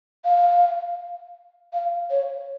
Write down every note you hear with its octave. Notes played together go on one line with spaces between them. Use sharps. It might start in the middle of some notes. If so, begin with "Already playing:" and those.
F5
F5
C#5